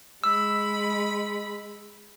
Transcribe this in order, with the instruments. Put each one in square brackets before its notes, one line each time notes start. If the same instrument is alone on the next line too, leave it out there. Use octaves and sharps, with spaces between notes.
[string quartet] G#3 B5 [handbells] E6